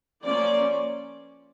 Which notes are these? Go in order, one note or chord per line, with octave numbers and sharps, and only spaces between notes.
F3 A#3 C#4 D5